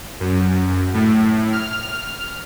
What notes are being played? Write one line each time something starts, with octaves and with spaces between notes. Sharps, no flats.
F#2
A2
F6